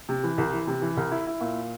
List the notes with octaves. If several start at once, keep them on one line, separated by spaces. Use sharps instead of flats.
C3
E3
C2
E3
C3
E3
C2
E4
E4
A#2